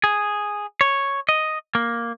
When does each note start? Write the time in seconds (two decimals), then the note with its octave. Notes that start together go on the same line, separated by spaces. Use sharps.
0.04 G#4
0.81 C#5
1.29 D#5
1.75 A#3